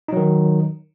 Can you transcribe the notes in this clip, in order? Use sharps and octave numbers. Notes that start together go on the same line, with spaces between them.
D#3 F#3 D#4